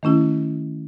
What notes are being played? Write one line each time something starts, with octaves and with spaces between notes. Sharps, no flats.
D#3 A3 C#4 E4